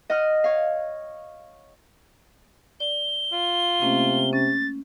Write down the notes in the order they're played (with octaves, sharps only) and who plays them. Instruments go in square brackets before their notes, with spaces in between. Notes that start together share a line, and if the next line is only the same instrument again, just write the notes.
[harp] D#5 F#5 F6
C#5 F5
[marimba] D5 [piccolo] G7
[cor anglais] F4
[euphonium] C3 [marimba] A3 A#3 C#4
[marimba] C#4 [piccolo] A6